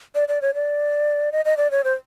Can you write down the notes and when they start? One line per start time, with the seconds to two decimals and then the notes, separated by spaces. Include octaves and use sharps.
0.15 D5
0.28 D5
0.42 C#5
0.54 D5
1.32 D#5
1.45 D#5
1.57 D5
1.71 C#5
1.84 C5